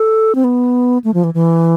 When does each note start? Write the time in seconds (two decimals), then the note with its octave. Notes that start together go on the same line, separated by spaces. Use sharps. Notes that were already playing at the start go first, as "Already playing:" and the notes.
Already playing: A4
0.35 C4
0.44 B3
1.04 A3
1.14 F3
1.24 E3
1.34 E3